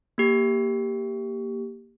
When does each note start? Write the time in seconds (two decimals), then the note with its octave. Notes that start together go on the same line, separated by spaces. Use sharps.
0.18 A#3 G4